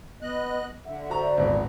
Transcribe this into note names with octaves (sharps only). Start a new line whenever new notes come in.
B3 D#5 F#6
D3 E5 F#5
F#4 C5 D5 A#5
D#1 G#1 B3